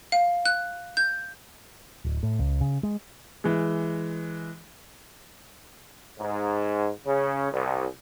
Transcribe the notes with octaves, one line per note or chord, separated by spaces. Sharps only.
F5
F#6
G6
D1
A2
C#2
C#3
G#3
E3 G#3
G#2
C#3
C2